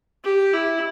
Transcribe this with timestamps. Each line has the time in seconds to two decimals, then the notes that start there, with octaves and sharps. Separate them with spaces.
0.24 G4
0.53 E4